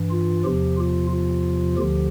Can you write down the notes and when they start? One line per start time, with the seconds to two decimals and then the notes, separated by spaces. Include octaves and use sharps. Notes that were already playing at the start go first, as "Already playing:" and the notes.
Already playing: G2 E3
0.11 F4
0.44 E2 C3 F3 G4
0.78 F4
1.11 F4
1.77 D2 D3 F3 G4